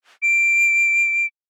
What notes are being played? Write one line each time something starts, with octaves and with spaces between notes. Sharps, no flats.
D7